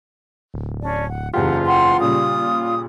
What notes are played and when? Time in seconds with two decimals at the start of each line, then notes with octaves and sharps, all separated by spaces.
0.54 D1
0.82 C#4 D4 D5
1.08 F#5
1.34 F#1 E2 F4 G4 F#5
1.66 F#5 G5 C6
2.00 A#2 C#3 G3 D#6